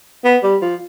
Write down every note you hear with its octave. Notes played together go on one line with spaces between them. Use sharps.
B3
G3
F3